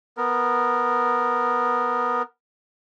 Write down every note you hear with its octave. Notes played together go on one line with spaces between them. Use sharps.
B3 A#4